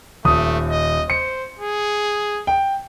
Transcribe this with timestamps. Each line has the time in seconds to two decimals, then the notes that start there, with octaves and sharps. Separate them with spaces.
0.25 D#1 A3 D#6
0.70 D#5
1.10 C5 C#7
1.59 G#4
2.47 G5